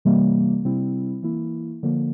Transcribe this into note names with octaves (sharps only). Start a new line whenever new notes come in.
C3 E3 G3 A#3
C3 G3 C4 E4
E3 A#3 E4
D3 F3 A#3